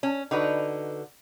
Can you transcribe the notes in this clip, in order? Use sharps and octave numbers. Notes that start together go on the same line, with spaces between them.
C#4
D3 D#4 F#4 B4